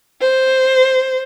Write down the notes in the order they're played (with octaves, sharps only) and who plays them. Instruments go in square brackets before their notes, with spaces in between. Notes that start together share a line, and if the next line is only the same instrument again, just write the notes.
[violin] C5